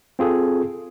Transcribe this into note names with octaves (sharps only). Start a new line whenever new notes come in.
C4 F4 G#4 A4